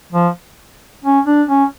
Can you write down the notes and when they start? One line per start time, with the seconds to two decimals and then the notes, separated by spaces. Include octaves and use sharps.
0.12 F3
1.04 C#4
1.27 D4
1.48 C#4